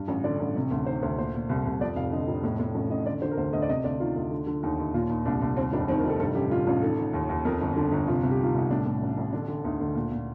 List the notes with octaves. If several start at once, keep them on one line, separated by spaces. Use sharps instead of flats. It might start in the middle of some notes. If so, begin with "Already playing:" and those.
Already playing: G2
A1
D3 D5
A1
C3
D2
D#3 C5
D2 C5
A#2 C5
A#2
C2
C2
F2 D5
F1 F5
D3 D#5
F1
A2
A2
A1
A1 D#5
D3 D5
D3 C5
A#4
D2 C5
D2 D#5
D5
C3 D#5
D2 D5
D#3 F4
D2
D3
D3
D#2 D#4
D#2 D#4
A#2 F4
A#2 D#4
C2 D4
C2 D4
D#2 C4
F1 D4
D#3 C4
A#4
F1 A4
G2 A4
A1 G4
D3 F4
A1 F4
D#3 A4
D#3
D#2
D#2
F2 A#4
G1
D3 A4
G1
C3 F4
C2
G4
D#3 F4
C2 D#4
A2 D4
A2
A1
A1
D3 D4
D3
D2 D#4
D2
A#2
A#2